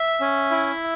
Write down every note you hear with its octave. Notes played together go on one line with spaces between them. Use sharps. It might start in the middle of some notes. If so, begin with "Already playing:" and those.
Already playing: E5
C#4
E4